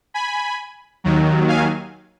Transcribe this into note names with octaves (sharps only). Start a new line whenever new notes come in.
G#5 B5
D#2 D#3 F#3
F5 G#5